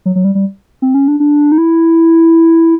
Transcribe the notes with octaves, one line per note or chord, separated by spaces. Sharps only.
F#3
F#3
G3
G3
C4
C#4
D4
D4
D#4
E4